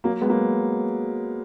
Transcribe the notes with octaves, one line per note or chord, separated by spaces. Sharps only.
F#3 A#3
G#3 B3
F#3 A#3